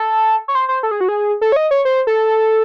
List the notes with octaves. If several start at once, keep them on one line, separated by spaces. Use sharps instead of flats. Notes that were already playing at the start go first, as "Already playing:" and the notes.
Already playing: A4
C#5
C5
C5
A4
G#4
F#4
G#4
A4
C#5
D#5
C#5
C5
A4